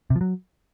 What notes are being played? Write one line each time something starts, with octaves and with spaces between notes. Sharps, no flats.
C3
F3
F#3